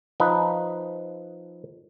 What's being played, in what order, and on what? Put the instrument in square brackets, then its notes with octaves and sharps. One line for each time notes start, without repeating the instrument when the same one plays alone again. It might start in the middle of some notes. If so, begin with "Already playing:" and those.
[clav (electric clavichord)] F3 D#4 B4